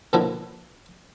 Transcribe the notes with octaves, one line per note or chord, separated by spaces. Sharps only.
B2 D3 F3 A#3 E4 F#4